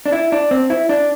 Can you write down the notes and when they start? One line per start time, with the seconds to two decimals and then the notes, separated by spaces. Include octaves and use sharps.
0.06 D4
0.12 E4
0.32 D4
0.51 C4
0.70 E4
0.89 D4